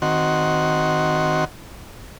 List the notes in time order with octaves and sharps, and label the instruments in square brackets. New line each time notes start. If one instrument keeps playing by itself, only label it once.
[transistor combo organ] D#3 C4 F#4